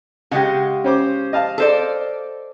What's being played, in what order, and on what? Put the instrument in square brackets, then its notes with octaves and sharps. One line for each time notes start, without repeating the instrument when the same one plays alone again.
[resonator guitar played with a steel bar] C#3 G#3 G4 [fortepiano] D#5 F#5
[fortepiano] C#4 C5 D6
D#5 F5 A5
[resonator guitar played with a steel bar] A4 C5 D5